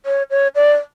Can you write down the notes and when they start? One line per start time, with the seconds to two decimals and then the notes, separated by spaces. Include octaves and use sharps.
0.06 C#5
0.31 C#5
0.55 D5